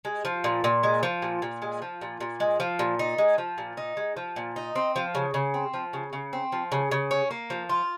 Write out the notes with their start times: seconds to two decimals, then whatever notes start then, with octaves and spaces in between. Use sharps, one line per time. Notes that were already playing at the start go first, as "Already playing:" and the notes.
0.05 G#3
0.25 F3
0.44 A#2
0.64 A#2
0.83 G#3
1.03 F3
1.22 A#2
1.42 A#2
1.62 G#3
1.82 F3
2.01 A#2
2.21 A#2
2.40 G#3
2.60 F3
2.79 A#2
2.99 D#4
3.18 G#3
3.38 F3
3.58 A#2
3.77 D#4
3.97 G#3
4.17 F3
4.36 A#2
4.56 D#4
4.76 C4
4.96 F3
5.15 C#3
5.34 C#3
5.54 C4
5.74 F3
5.93 C#3
6.13 C#3
6.33 C4
6.52 F3
6.72 C#3
6.91 C#3
7.11 C#4
7.31 A#3
7.50 F3
7.69 F4